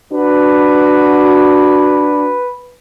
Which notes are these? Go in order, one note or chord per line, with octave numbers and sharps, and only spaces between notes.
D4 F#4 B4